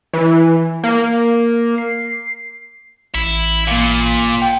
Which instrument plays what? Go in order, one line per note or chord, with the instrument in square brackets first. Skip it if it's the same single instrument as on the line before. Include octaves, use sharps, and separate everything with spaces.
[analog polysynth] E3
A#3
C7
[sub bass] A1 [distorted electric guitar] E4
[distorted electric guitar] A#2 [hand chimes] A#3 F5
[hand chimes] G5